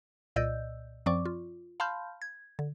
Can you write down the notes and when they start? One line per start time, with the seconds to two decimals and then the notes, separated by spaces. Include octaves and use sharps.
0.36 C2 A#2 D5 D#5 E6 G6
1.06 F#2 F3 C4 D5 C#6 D6
1.25 F4
1.80 F5 A5 B5 C6 F6 G6
2.22 G#6
2.59 D3